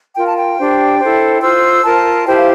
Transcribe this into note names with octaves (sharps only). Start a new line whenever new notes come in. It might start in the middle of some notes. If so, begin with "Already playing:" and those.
F4 A#4 G5
A5
G5
D4 G4 C5
E4 A4 C5
F4 C5 E6
F4 A#4 A5
E4 G4 C5 G5
F5